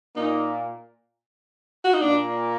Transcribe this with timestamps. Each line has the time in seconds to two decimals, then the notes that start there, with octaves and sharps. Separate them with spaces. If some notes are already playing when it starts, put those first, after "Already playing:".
0.16 A#2 A#3 D#4
1.84 F#4
1.94 D#4
2.02 A#2 A#3 D4